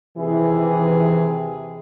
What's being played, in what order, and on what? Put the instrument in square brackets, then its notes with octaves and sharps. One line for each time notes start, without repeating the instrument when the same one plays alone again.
[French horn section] D#2 C3 G#4 [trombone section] E3